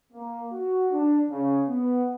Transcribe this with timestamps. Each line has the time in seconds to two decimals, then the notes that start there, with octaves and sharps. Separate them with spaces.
0.12 A#3
0.52 F#4
0.91 D4
1.30 C#3
1.68 B3